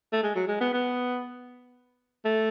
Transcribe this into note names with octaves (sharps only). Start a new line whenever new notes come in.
A3
G#3
F#3
G#3
B3
B3
A3